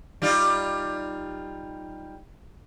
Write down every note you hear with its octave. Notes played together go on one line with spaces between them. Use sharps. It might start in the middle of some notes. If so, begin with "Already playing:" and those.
G3 D#4 F4